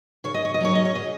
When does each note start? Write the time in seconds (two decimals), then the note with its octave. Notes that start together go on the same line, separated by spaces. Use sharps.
0.24 C#3 C#5
0.34 D#5
0.45 C#5
0.54 D#5
0.60 F#3 C#4 C#5
0.75 D#5
0.85 C#5
0.95 C#3 D#5